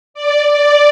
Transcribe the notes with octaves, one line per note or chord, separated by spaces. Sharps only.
D5
D5